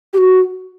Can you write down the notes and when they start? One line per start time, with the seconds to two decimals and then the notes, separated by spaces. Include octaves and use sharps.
0.13 G4
0.18 F#4